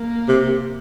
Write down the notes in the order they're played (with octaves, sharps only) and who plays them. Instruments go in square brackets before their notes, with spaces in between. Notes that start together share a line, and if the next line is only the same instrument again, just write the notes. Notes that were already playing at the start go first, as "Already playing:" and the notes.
Already playing: [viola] A#3
[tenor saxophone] C3